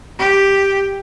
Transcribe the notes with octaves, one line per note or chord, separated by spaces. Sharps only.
G4